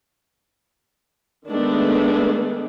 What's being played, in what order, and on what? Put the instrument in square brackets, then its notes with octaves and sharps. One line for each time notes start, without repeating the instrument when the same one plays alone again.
[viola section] D#3 G#3 A3 B3 D4